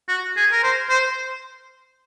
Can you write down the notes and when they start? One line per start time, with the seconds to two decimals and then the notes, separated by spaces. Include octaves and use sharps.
0.08 F#4
0.36 G#4
0.52 A#4
0.63 C5
0.89 C5